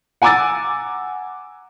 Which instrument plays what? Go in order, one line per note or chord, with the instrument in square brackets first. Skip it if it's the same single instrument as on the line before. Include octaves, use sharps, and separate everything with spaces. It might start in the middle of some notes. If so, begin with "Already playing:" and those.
[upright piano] F#5 G#5 A#5 D6 E6 A6